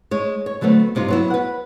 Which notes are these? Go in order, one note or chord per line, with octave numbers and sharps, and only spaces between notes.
G#3 C#5
C#5
D3 F#3 A3 B3 C4
G2 C3 D#4 F4
F#3 B3 E4
B4 F#5